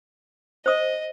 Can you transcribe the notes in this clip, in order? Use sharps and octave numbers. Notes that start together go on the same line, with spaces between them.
C5 D#5 D#6